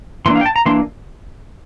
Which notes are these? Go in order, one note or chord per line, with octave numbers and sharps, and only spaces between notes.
E3 A#3 D4 C6
F5
G5
A5
A#5
E3 A#3 D4 C6